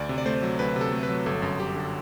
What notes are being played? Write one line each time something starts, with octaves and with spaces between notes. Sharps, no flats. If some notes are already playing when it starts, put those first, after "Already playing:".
Already playing: D2 D5
C3
D5
A3 C5
F#3
D2 B4
C3
A4
A3
B4
F#3
G1 A4
F#2
G1 G4
D3